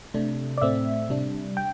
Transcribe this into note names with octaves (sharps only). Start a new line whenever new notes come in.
C3 A3 D4
D5
A2 A3 C4 E5
C3 G3 D4
G5